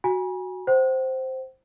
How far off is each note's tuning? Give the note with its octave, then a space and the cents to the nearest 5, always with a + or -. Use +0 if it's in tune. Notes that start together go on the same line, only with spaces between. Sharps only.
F#4 +0 G#5 -20 B5 -45
C5 +0 F#5 +45